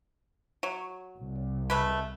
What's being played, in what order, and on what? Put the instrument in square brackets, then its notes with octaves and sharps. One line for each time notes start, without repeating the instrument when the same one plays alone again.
[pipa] F#3
[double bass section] C2
[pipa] G#3 A3 B4